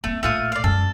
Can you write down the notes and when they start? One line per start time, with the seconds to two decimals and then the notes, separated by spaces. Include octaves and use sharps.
0.04 A3 A#3 C4
0.23 A#1 A2 A3 F4 D#6
0.52 D5 F5
0.64 F#2 G#3 A4